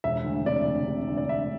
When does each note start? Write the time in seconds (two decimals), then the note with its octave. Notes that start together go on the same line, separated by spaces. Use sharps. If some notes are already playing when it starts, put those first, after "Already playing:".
0.04 E1 E5
0.25 D2
0.46 C3 D5
0.66 D2
0.88 C3
1.09 D2
1.17 D5
1.29 D2 E5